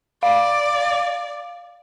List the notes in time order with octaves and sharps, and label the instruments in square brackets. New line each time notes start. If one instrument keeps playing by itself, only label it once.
[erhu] D5 [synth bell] F5